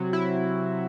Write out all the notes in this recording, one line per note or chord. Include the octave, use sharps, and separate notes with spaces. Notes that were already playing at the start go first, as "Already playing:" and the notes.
Already playing: C3 F#3
E4